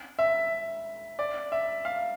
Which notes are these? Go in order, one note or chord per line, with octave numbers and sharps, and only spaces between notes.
E5
D5
E5
F5